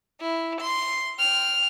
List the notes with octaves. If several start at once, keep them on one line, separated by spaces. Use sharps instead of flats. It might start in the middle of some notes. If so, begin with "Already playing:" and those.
E4
C6
G5 F6